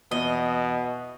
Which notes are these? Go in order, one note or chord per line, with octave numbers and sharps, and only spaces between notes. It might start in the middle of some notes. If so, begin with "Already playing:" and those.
E2 B2 D#5